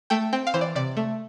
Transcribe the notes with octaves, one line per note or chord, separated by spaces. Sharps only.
A3 G5
C4 G5
F5
E3 C5
D5
C3 D5
A3